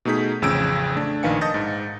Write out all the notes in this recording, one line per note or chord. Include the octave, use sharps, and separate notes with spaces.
B2 A3 D#4 G#4 G6 B6
A1 F2 C#3 E6 G#6 D7
A3 D4
A#1 D#3 B4 F5 G#5 C#7
D#5 A5 D#6 G6 A6 A#6
G#2